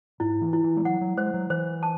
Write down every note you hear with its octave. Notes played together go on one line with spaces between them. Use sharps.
G#2 E4
E3
E4
E3
G#3
F#3 F#5
F#3
G#3 C5
F#3
E3 C5
A5